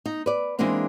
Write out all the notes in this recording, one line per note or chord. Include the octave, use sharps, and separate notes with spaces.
D#4
B4 D5
E3 G#3 A#3 C4 D4 D#4